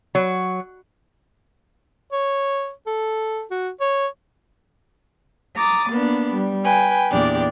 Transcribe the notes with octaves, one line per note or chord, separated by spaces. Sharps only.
F#3
C#5
A4
F#4
C#5
A#5 D6 D#6 A6
A#3 B3 D4
G3
B4 G5 G#5
E2 A#2 D4 G4 D5